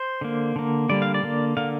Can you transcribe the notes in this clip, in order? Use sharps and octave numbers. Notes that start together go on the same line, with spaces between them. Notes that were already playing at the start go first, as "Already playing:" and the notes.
Already playing: C5
D3 A#3
D3 A#3
D3 G3 A#3 D5
F5
D5
D3 A#3
D3 A#3 F5